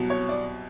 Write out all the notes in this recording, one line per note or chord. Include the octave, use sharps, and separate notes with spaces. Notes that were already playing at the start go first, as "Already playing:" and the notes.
Already playing: C2 B2 F#3
C#5
D5